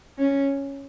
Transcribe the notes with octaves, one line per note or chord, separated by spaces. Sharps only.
C#4